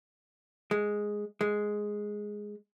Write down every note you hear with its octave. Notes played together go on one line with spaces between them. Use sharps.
G#3
G#3